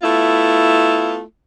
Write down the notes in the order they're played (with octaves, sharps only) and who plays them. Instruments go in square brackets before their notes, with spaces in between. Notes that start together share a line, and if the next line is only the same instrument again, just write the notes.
[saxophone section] A3 B3 E4 F4